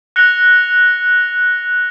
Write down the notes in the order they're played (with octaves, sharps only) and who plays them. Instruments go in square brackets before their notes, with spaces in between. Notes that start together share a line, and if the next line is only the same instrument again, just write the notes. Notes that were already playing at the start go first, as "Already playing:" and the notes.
[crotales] F#6 A#6 C#7 F7 G7